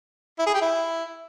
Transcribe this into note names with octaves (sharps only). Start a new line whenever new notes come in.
E4
G#4
G4
E4